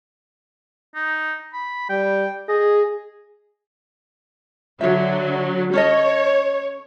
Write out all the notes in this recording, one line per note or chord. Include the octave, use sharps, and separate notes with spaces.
D#4
B5
G3 G5
G#4 D#5
D3 F#3 C#5 E5
C#4 A4 C#5 D#5